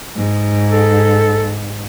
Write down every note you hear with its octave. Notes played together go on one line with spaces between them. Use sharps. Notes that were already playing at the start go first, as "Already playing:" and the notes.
G#2
A4